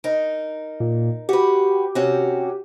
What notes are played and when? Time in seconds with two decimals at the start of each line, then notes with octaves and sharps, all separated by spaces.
0.04 D#4 A#4
0.80 A#2
1.29 F#4 G4 B4
1.95 C3 C#4 F#4